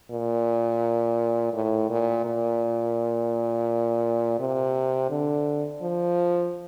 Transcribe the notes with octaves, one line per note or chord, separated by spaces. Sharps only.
A#2
A2
A#2
A#2
C3
D3
F3